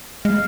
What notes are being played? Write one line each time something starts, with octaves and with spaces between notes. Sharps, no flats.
G#3 F5